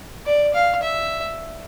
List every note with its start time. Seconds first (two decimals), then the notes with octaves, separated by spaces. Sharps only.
0.26 D5
0.54 F5
0.83 E5